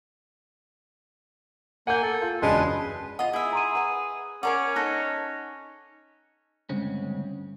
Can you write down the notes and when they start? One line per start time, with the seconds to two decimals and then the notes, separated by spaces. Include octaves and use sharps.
1.87 A#3 F#5 G#5 G6
2.02 A4
2.22 F4
2.42 E1 F#2 C#3 G#3 D4 B4 C6
3.19 F4 D#5 F#5
3.33 E4 G#4 E5
3.53 A#5 C6 D#7
3.75 B4 F#5 D#7
4.43 C#4 G#4 A#4 D5 F#5
4.76 D#4 A4 F#6 A#6
6.69 D2 G2 C#3 G#3 C4 C#4